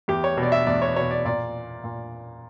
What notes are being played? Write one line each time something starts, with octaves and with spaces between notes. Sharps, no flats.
E2 G4
C#5
B2
D5
E5
E2 D5
C#5
B2 C#5
D5
A#2 D5
A#2